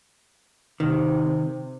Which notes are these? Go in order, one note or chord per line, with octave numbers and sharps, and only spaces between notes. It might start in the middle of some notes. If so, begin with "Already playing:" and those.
C3 D#3